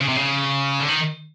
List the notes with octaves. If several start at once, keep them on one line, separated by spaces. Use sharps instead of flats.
C#3
C3
C#3
D3
D#3